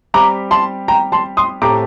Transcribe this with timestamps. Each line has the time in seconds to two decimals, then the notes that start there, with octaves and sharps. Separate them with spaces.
0.14 G3 C4 G4 A#5 D6
0.51 A5 C6
0.88 G5 A#5
1.12 A5 C6
1.37 C6 D#6
1.62 A2 A3 C4 G4 C5 A#5 D6